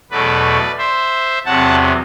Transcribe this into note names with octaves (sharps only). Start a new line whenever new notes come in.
E2 B2 F#3 A3 B4 D5
C5 E5
E2 C3 F#3 F#5 A5